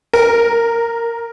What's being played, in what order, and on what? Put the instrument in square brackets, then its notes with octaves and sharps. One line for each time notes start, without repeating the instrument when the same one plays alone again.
[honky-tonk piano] A#4